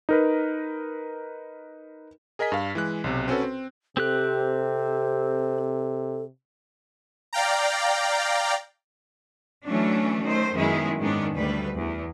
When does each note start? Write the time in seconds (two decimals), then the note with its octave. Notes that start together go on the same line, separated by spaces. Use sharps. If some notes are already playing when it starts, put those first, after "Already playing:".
0.09 D#4 A#4 B4
2.39 G#4 A#4 D#5 G#5 B6
2.52 G2 F5
2.75 E3 G#3 F#6
3.04 B1 C3
3.28 C4 C#4 F#4 A4 B4
3.43 C4
3.97 C3 C4 G4 A4 F#6
7.33 D5 F5 G5 A#5
9.65 E3 F#3 A3 C#4 D4
10.22 D#3 A3 C5
10.54 F#2 D#3 G#3 B3 E4 G#4
10.99 G#2 D#3 G#3 B3 C#4 D4
11.33 D2 G3 B4
11.76 E2